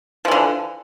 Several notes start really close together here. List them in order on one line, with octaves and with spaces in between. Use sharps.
F3 E3 D3